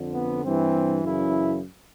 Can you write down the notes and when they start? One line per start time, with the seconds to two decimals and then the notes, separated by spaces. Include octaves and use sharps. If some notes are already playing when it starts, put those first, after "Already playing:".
Already playing: F2 D3
0.14 B3
0.44 G2 E3 C4
1.04 F#2 C#3 E3 E4